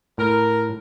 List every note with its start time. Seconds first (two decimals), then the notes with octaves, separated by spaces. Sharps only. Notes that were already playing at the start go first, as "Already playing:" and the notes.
0.18 A2 A#4